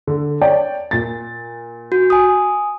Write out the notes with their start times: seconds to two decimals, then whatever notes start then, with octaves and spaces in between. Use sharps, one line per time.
0.07 D3
0.41 C#5 D5 G5
0.91 A#2 A6
1.92 F#4
2.10 G#5 D#6